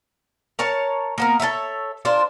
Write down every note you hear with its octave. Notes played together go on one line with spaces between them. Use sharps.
A#4 C#5 A5
A#3 B3 A#4
A4 A#4 C#5 E5
D4 F4 A#4 C5